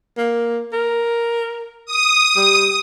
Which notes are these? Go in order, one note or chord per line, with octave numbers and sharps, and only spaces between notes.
A#3
A#4
D#6
G3